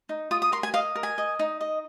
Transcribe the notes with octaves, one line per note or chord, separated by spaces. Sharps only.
D#4
F4 D#6
D#6
A#4 C6
G#5
D#5 F5
A#4
G#5
D#5
D#4
D#5